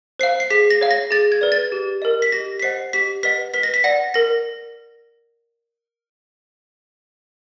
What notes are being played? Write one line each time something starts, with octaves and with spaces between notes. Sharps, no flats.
C5 F5 C7
C7
G#4 B6
A#6
C#5 F5
A#6
G#4 A6
G#6
B4 D5
A6
G4
A#4 D#5
B6
G4 A#6
B6
C5 D#5 F#5 C7
G4 B6
B4 D#5 F#5 B6
B4 B6
A#6
B6
D5 F#5 A#6
A#4 A#6